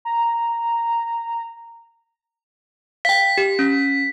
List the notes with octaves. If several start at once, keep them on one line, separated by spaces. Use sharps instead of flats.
A#5
F5 G5 B6
G4
C#4